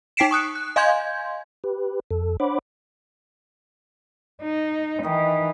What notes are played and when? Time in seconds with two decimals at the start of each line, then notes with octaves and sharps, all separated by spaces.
0.17 D#4 G5 B6 C7 D7 E7
0.31 C#6 D#6 F#6 C#7
0.55 F#6
0.76 D#5 F5 G#5 C6 G6 G#6
1.64 G4 B4
2.11 F2 A4
2.40 D4 C5 C#5 F#5 B5 D6
4.43 D#4
5.03 D#3 E3 D#5